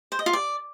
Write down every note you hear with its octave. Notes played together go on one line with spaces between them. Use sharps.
C5
D#5
F4
D5